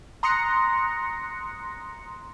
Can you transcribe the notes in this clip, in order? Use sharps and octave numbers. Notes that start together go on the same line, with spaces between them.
A#5 C6 D#6 F#6 A#6 C#7